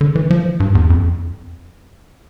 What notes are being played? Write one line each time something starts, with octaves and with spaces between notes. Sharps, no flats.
D3
E3
F3
G2
E2
F2